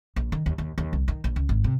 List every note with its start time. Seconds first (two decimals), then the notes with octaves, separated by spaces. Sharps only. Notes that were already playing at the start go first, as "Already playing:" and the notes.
0.16 A#1
0.32 D#3
0.46 D#2
0.58 D#2
0.78 D#2
0.93 C2
1.08 D#3
1.24 A#1
1.36 C#2
1.49 G#1
1.64 C3